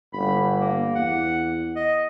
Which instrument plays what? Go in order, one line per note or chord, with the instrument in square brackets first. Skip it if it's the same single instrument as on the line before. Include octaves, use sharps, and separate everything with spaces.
[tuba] G1 [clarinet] B5
[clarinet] A#3
[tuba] E2 [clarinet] F#5
[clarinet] D#5